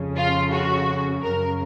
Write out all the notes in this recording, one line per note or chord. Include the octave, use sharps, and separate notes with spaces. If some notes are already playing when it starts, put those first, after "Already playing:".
Already playing: F2 C#3
F4
F#4
F#2 C#3 A#4